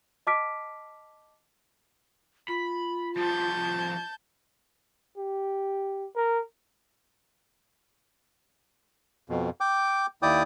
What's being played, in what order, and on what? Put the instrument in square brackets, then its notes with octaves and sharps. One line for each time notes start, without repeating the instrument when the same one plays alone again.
[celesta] D#5 A5 D6 F6 B6 D7
[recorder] F4 [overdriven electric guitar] B5
[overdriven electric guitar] F3 G3 [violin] A5 G6
[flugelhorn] G4
A#4
[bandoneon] F2 B2
G5 D6
D#2 E4 D5 G5 D6 D#6